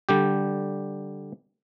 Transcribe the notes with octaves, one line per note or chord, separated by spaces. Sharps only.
D3 G3 G4